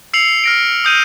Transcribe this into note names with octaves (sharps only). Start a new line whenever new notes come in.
E6 C7 C#7 F7 F#7
F6 A#6 D7
D#6 G6 D#7